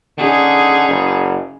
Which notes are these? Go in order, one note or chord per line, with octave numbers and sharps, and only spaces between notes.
D3 C#4 D#4 G#4
F#1